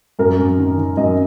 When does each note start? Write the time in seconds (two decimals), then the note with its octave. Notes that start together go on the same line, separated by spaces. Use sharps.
0.19 F#2 A#4
0.39 F#2
0.58 D#3
0.78 D#3
0.97 F#2 D#5